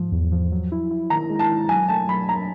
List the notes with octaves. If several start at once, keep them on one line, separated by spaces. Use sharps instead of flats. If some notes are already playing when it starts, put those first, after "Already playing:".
Already playing: G#2 F3
E2
F3
F#3
E4
E4
D#3 A#5
G#3
A5
D#3
F#3 G#5
A3 A5
F#3 B5
F#3 A#5